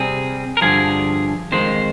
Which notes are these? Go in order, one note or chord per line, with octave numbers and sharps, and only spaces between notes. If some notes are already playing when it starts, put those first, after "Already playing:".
Already playing: C3 G3 C4 G#4
A#4
G2 D3 F3 G#4
F2 D#3 G#3 C5